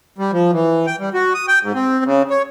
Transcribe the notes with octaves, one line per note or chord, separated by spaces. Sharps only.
G3
F3
E3
G5
G3
F#4
D#6
G5
G#2
C4
C#3
C#5